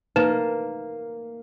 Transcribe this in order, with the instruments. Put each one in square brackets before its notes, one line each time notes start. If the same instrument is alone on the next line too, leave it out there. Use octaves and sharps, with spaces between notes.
[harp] A#3 [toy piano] D#4 B4